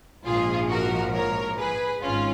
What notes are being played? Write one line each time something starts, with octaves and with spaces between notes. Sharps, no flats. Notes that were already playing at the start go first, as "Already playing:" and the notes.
A#1 G#2 F3 F4 G#4
F#4 A#4
A#4 C#5
G#4 B4
G#1 G#2 C#4 F4